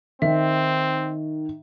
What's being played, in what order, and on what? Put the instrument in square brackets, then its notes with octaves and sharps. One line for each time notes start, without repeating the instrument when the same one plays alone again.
[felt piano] D#3 [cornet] C4 [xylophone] E5